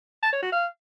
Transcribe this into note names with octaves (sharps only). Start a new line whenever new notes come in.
A5
C#5
F#4
F5